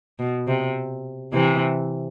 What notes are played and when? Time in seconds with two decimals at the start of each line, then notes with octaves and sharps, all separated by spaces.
0.19 B2
0.47 C3
1.33 C3 E3